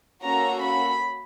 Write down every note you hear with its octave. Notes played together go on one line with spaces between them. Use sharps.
A#3 C#4 F#4 A4 A#5
B5